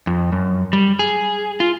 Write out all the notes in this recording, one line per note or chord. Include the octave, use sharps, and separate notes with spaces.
F2
F#2
G3
G#4
F4